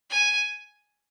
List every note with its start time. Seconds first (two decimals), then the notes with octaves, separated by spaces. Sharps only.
0.11 G#5